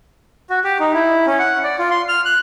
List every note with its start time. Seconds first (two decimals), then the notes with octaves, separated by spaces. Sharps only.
0.50 F#4
0.64 G4
0.80 D#4
0.93 E4
1.26 C#4
1.39 F#5
1.64 D5
1.79 F4
1.90 C6
2.09 F6
2.25 F#6